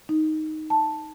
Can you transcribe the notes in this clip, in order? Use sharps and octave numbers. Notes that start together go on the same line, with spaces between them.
D#4
A5